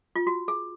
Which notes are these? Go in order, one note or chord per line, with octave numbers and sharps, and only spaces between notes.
F4
F#4
G#4